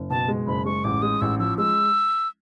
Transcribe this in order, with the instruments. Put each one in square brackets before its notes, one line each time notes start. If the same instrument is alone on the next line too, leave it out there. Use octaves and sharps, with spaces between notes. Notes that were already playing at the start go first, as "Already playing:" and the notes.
Already playing: [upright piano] F#1
[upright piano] B2 [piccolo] A5
[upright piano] G#3
[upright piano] F#1 [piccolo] B5
[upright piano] G#3 [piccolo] C#6
[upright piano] A1 [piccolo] D6
[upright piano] G#3 [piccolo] D#6
[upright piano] A1 [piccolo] E6
[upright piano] F3 [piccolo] E6
[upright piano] G#3 [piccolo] E6